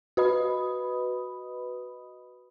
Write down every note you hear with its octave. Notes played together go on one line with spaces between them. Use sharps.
F#4 B4 D#5 B5 D#6